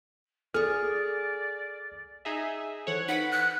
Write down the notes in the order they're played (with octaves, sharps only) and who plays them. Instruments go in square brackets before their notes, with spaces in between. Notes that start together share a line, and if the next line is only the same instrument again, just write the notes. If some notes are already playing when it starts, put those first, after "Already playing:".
[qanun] G#4 C#6 [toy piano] A4 [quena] D5 [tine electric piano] F6
[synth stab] D#4 G#4 E5
[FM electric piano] E3 A4 C5 [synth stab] C#5 F#5
[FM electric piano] D#4 [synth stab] B4 B5 [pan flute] F#5
[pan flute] F#6